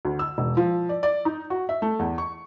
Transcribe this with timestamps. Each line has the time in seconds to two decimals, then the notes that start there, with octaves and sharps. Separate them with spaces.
0.05 D2
0.19 E6
0.38 E1
0.57 F3
0.89 D5
1.03 D5
1.25 D#4
1.50 F#4
1.69 E5
1.82 A3
1.99 E2
2.18 C#6